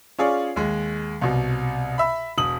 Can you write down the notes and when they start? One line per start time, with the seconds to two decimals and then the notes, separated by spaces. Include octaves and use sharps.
0.18 C#4 F4 G#4 C#5 D5
0.56 D#2 G#3
1.21 C2 B2
1.98 E5 B5
2.38 E1 D#6 F#7